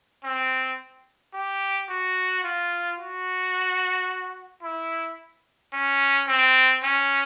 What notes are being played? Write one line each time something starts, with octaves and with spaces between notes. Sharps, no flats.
C4
G4
F#4
F4
F#4
E4
C#4
C4
C#4